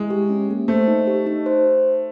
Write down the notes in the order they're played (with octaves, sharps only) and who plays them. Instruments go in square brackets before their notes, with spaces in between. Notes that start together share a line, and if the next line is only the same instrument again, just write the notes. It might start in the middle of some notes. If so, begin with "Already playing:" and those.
Already playing: [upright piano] G#3 [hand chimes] E4
[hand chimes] G4
C#4
A#3
[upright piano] A3 [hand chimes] C5
[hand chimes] D#4
G4
D#4
C5